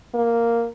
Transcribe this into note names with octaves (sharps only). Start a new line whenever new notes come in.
A#3